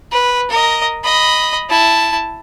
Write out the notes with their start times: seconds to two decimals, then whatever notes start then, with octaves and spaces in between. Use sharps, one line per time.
0.12 B4
0.51 A#4 D#5
1.04 D#5 B5
1.70 E4 A5